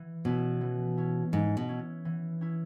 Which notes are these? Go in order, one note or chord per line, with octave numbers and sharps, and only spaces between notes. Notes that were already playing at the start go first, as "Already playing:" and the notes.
Already playing: E3
B2 C#4 E4
E3
C#4 E4
G#2 E3
B2
C#4 E4
E3
C#4 E4